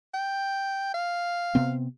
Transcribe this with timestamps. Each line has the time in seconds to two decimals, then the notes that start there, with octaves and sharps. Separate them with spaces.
0.14 G5
0.94 F5
1.55 C3 B3 C4